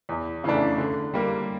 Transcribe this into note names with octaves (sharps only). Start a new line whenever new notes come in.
E2
C#3 E3 A3 D4
D3
G3 A#3